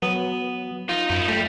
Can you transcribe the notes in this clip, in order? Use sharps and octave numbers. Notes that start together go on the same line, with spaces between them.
F#3 B3
D#4 F4
F#2 D#4 E4
G3 A3